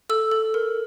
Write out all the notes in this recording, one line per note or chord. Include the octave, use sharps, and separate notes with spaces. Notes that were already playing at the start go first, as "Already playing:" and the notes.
A4 E6
A4
A#4